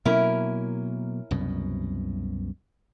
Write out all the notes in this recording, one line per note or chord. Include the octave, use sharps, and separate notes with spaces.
B2 F#3 A#3 C#4 E4 A#4
C2 F#2 B2